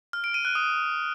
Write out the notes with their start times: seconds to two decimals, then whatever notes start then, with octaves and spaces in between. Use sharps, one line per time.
0.13 F6
0.24 D7
0.34 D#7
0.45 F#6
0.55 D#6